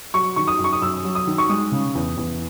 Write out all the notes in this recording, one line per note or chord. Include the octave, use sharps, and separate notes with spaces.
F#3 C#6
D#3 C#6
D#6
F#2
C#6
D#6
F#2 E6
F#3
D#6
D#3
C#6
G#3 D#6
C#3
E2
E2